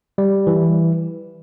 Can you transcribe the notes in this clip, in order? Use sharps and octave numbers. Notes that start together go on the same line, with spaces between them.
G3
E3